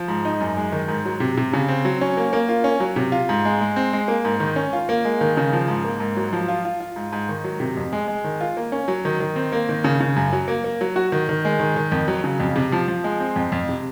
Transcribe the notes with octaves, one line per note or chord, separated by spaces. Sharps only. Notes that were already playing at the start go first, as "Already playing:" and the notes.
Already playing: F3
G#2
D#4
F#2
G#3
D#3
G#2
F#3
C3
C3
C#3
C4
F#3
C#4
A#3
A#3
F4
C#4
F#3
C3
F4
G#2
G#3
G#3
C4
G#3
A#3
G#2
D#3
C#4
F4
A#3
G#3
D#3
C#3
F3
G#2
A#3
G#2
F#3
F3
F4
F4
F4
G#2
G#2
D#3
F#3
C3
F2
G#3
G#3
D#3
F4
A#3
C#4
F#3
D#3
D#3
C4
A#3
D#3
C#3
C#3
F#2
F#3
A#3
A#3
F#3
F#4
D#3
D#3
G#3
D#3
D#3
F2
F#3
C#3
F2
C3
F3
F3
G#3
C4
F2
F2
C3